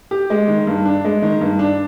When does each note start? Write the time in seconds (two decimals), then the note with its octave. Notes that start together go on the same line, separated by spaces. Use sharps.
0.11 G4
0.30 G#3
0.48 D#3
0.67 G2
0.85 D4
1.05 G#3
1.22 D#3
1.41 G2
1.59 D4